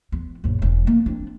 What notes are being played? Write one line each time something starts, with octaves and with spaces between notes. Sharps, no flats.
E2
A#1 F#2
E1 E3
A#3
C4 D4